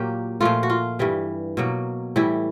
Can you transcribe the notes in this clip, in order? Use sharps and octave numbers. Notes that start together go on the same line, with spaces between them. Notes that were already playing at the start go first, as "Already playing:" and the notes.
Already playing: A#2 F#3 A#3 G4
A#2 F3 A3 F4
F#4
F4
G2 E3 G3
B2 F#3 A#3
A2 E3 G3 E4